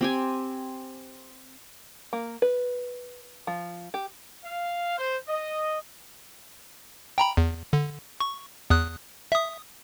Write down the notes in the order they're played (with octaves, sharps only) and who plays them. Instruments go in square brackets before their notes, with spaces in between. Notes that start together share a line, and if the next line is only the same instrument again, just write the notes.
[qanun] C4 G4 G#5
[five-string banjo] A#3
B4
F3
G4
[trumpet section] F5
C5
D#5
[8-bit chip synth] G5 A#5 B5
E2
D3
C#6
E2 D#6 F#6
E5 D#6